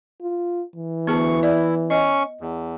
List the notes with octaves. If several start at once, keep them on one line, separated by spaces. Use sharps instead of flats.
F4
E3
D2 B3 G#4 A5 C#6
E4 D5
C#4 D#5 C#6
E2